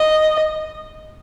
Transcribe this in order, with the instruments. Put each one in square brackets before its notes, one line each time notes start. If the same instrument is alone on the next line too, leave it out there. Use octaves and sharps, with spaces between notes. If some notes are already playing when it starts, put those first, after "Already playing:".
Already playing: [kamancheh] D#5